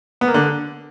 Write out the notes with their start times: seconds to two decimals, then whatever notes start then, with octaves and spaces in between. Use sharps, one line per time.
0.21 B3
0.28 A#3
0.34 D3